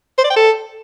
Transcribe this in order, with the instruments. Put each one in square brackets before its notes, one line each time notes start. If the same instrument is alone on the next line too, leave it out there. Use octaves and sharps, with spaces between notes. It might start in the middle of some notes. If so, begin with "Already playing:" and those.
[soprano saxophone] C5
D5
G5
A4